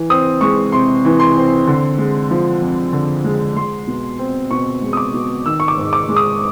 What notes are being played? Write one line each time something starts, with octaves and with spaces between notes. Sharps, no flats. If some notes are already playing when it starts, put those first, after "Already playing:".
Already playing: E3
C4 D#6
G#3 C#6
C3 C6
E3
C6
C4
D3
G#3
F3
F2
D3
G#3
G#3 C6
B2
C4
B2 C#6
G#3
D#6
D6
B2
D#3 E6
C#6
D6
G#2
D6
G#3
D#6